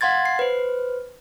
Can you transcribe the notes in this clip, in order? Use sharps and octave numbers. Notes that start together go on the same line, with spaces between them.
F5 F#5 C6 G#6 A6
C7
B4 C5